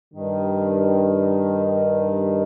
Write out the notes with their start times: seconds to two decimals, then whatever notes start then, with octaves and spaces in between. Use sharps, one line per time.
0.14 G2 D#3